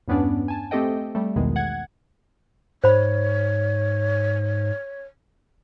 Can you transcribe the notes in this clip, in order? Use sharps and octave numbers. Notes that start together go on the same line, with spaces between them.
E2 G2 B3 C#4 D4
G#5 A5
A3 C4 G4 A4 D#5 G5
G3 A3
B1 E2 B2 D#3 G#3
F#5 G#6
G#2 C5 C#5 B5